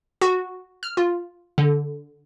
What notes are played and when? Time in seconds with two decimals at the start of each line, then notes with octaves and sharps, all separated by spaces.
0.21 F#4
0.83 F6
0.97 F4
1.58 D3